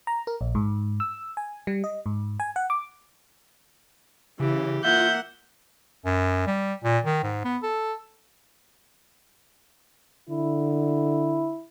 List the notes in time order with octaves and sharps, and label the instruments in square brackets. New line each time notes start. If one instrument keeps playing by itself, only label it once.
[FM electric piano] A#5
A#4
A#1
G#2
E6
G#5
G3
D#5
G#2
G#5
F#5
D6
[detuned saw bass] C#3 [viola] E3 [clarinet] G4
[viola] A#3 F#5 [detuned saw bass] F4 [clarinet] E5 [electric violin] G6
[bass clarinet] F#2
G3
A#2
D#3
G#2
B3
A4
[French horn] D3 [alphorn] E4